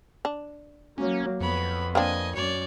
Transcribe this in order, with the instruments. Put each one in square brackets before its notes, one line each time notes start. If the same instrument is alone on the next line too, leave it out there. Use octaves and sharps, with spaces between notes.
[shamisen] D4
[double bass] F#3 A#3 [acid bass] C#4
[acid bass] F2 [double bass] B3 [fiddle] C#5 B5
[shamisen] A#3 C4 D4 [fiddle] D#5 G#5
[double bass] F#2 [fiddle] C#5 D5